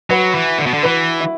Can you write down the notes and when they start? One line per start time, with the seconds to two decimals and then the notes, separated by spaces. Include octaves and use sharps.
0.10 F#3 F#4 B4
0.35 E3
0.59 D3
0.66 B2
0.74 D3
0.83 E3 F#4 B4
1.20 E4